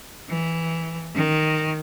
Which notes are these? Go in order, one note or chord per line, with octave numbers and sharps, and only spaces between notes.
E3
D#3